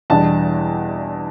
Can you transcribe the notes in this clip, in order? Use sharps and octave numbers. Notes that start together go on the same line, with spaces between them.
E2 B2 G3 D4 A5